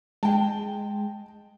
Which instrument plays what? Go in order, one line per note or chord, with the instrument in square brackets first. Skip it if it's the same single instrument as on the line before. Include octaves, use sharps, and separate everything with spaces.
[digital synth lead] G#3 [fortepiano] G5 A5